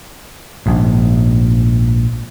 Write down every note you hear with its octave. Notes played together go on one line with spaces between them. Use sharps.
A#1 G#2